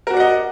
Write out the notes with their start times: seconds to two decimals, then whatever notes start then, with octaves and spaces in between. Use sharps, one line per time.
0.07 A#4
0.10 F#4
0.13 D5
0.17 F#5
0.20 D#5